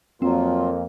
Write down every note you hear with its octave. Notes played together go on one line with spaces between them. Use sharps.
F2 F#3 A#3 C4 F4